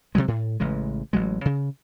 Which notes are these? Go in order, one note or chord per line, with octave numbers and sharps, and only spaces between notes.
C3 D#3 F#3 G#3
A2
A1 C#3 E3 G#3
A1 F#3 G#3
C#3